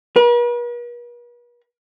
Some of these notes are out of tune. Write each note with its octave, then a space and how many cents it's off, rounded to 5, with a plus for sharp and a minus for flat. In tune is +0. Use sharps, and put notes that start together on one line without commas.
B4 -45